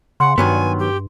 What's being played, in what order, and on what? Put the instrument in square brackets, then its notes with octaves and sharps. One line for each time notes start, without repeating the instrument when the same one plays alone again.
[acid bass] C#3 [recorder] F#5 [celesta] C6
[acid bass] G2 [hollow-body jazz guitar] D#3 F#3 B3 [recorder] G#5
[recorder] G4